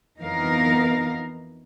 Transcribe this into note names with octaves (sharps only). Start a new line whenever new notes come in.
F2 E3 B3 D#4 A#4 F5